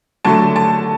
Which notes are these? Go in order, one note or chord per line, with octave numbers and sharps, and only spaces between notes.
D3 F#3 A3 A5
A5